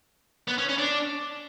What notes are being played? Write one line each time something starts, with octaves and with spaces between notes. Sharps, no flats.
B3
C#4
C#4
D4